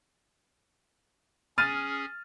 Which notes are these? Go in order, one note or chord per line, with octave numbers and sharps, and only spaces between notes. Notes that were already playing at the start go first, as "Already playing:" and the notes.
C#4 G#4 F6 A6 D#7